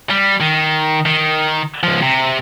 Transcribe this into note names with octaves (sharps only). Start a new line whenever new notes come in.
G3
D#3
D#3
C#2 F3
C3